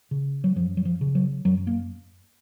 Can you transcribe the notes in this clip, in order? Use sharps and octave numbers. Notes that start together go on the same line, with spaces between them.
C#3
F#3
F#2 F3
F#3
F3
C#3
F#3
F#2 F#3
A#3